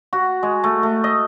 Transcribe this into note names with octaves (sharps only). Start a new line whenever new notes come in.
F#4
G#3
A3
A3
D#5